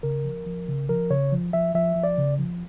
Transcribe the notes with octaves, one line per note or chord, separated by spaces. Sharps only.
C#3 A#4
F3
F3
C#3
F3 A#4
C#3 C#5
F3
F3 E5
F3 E5
F3
D5
C#3
F3